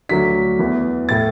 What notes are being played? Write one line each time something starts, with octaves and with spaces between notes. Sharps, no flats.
D2 D3 F#3 A3 D4 B6
E2 E3 B3
A2 A3 A6